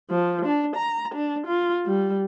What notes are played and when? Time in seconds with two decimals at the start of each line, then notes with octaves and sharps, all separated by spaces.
0.10 F3
0.46 D4
0.76 A#5
1.15 D4
1.47 F4
1.86 G3